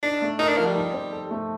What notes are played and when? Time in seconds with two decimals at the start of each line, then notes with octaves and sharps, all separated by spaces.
0.03 D4 D#4
0.22 A3
0.39 D#4 A#4
0.49 D4
0.57 F3 A#3
0.67 G3
0.76 D#4
0.94 C4
1.12 A4
1.31 A3